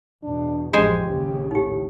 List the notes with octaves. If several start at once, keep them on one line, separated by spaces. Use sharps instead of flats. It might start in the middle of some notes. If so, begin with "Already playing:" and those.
E2 B2 D4
A1 F#2 F3 G#3 G4 C5 G#5
A#1 D#2 C#3
A2 D#4 G4